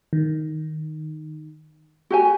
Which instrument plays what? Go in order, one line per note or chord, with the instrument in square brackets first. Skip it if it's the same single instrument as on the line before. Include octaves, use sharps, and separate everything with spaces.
[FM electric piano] D#3
[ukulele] F#4 G4 G#5